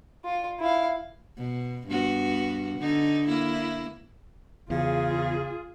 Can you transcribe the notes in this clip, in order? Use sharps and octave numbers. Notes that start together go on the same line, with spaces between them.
F4
E4 F5
B2
G2 B3 F#4
D3 D#4
A#3 E4
E2 C#3 F4 G#4